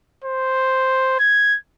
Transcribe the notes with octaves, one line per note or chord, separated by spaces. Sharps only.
C5
G#6